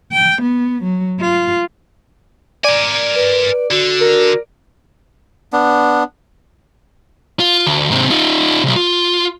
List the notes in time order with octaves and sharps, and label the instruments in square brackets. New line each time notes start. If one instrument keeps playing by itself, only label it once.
[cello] G5
B3
F#3
F4
[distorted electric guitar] A#4 G#5 [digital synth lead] D5
[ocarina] B4
[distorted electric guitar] D3 [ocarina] F#4
[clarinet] A#4
[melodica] B3 D4
[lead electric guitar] F4
D2
G#2 C3
D#4 F4
B1 C3
F4